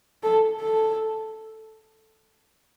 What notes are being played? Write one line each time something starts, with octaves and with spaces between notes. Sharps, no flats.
A4
A4